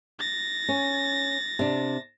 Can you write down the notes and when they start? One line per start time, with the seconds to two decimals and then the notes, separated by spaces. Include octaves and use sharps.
0.20 A6 A#6
0.69 C#4
1.59 C3 D4